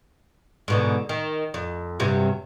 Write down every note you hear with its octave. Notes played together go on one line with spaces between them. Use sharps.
G#2 B2 D3
D#3
F2
G2 C3 F#3